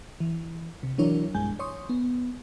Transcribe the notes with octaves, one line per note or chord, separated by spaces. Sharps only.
E3
C3
E3 F#3 D4 E4 A#4 C#5
B1 G2 G#3 G#5 G6
C#5 C6 C#6 D#6
B3